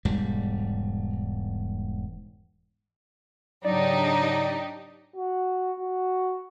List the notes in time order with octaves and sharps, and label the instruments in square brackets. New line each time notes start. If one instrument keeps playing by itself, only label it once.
[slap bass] E1 G#2 G3
[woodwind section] G#2 C#3 F#3 [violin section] D4 D#4 G4 [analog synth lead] D5
[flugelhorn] F#4
F#4